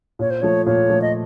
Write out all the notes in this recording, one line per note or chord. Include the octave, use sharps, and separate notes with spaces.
A#2 C#5
C5
F3 A3 C#5
A#2 C#5
F3 A3
D#5